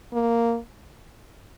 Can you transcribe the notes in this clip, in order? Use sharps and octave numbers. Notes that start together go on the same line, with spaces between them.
A#3